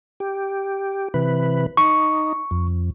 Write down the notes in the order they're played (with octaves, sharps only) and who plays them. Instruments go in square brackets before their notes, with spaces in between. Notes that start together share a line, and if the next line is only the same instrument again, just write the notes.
[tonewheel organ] G4
C3 E3 B4
[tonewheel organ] D#4 [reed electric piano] C#6
[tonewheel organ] F2